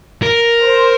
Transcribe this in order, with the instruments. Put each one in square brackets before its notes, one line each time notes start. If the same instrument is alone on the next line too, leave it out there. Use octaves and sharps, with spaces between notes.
[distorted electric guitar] A#4
[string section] C5